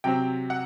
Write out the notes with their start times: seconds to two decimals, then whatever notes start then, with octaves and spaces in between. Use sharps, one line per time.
0.04 C3 F#3 C4 G5
0.50 F#5